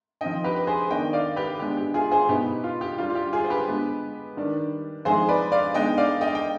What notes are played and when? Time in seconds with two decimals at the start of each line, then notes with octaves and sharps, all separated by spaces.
0.21 F3 C4 D#4 D#5 G5
0.44 G4 B4
0.56 B4
0.67 G#4 C5
0.90 D#3 B3 D4 D#5 G5
1.13 D5 F5
1.36 G4 B4
1.59 D3 G#3 B3 D4 G4
1.77 G4
1.94 F4 G#4
2.12 G#4 C5
2.29 B2 B3 D#4 G4 B4
2.64 F4
2.81 G4
2.98 D3 G3 D4 F4
3.10 F4
3.15 G4
3.33 F4 G#4
3.44 C5
3.50 G4 B4
3.67 D3 G#3 B3
4.37 D#3 G3 D4
5.05 F3 G#3 C4 D#4 G#4 C5
5.29 B4 D5
5.52 D5 F5
5.74 D3 G#3 B3 D#4 D#5 G5
5.98 D5 F5
6.21 D#5 G5
6.35 G5